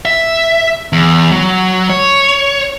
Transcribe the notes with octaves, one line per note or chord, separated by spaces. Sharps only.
E5
E2
F#3
C#5